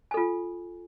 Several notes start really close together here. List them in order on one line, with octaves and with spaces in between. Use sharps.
G#5 A4 F4